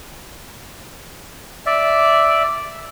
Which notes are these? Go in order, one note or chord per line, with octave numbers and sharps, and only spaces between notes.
D5 E5